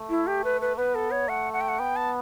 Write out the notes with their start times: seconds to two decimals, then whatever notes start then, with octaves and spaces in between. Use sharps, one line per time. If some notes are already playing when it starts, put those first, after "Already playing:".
Already playing: A3
0.10 E4
0.27 G4
0.44 B4
0.61 B4
0.77 B3 B4
0.95 A4
1.11 C#5
1.28 A3 F#5
1.53 F#5
1.61 G5
1.69 F#5
1.79 B3 G5
1.96 A5